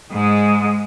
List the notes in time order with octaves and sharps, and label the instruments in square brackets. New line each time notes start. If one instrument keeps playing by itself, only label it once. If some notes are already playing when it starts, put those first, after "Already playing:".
[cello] G#2 G#3